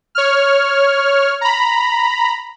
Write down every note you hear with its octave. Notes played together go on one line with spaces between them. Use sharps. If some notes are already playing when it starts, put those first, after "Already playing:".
C#5 F6
A#5 B5